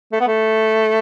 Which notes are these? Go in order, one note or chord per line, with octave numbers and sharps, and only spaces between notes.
A3
B3
A3